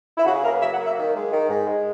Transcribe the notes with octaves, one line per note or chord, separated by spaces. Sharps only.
E4
C#3 F#4
G#4
A#3 A#4
B4
F#3 E5
F#5
A#3
E5
D#3
G#3
D#3
G#2
G#3